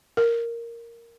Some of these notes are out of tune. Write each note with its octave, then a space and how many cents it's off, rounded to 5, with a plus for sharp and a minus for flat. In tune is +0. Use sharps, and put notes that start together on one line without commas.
A#4 -5